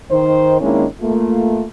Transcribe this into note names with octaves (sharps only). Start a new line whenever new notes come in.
D#3 C5
D#3 G#3 A#3 C#4 D4 E4
A3 A#3 F4